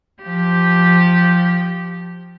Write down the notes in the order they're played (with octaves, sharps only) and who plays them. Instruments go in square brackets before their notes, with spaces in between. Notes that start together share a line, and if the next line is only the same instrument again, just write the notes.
[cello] F3 G4